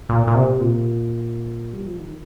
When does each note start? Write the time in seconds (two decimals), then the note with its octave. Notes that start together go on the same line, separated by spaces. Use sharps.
0.09 A#2
0.27 A#2
0.35 C3
0.60 A#2
1.73 G3
1.86 F3
1.99 D#3